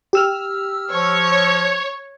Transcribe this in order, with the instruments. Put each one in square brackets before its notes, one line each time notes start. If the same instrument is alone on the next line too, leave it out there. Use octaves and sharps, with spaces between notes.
[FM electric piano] G4 E6 F6
[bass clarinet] F3 [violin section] C#5